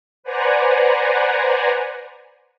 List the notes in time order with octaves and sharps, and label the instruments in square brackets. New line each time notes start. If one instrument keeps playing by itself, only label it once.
[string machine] B4 C5 D5 F#5 G#5 A#5